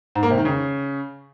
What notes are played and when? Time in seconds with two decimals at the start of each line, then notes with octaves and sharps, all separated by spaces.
0.15 G#2
0.23 A#3
0.30 C3
0.38 D#3
0.45 C#3